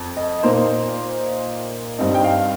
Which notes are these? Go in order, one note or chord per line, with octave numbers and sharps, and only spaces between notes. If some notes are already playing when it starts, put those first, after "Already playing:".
Already playing: F2
D#5
A#2 A#3 D#4 C5
G2 G3 C4 D#4
G5
F5